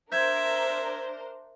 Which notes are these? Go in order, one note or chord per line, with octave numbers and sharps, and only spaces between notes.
D4 A#4 C5 E5 G6 G#6